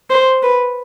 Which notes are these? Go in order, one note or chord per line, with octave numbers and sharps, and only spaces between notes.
C5
B4